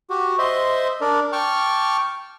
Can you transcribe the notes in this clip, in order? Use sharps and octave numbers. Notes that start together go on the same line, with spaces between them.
F#4 G4
C5 D#5 E5 C6
D4 A#4 D5
G5 A5 C#6 D6 F6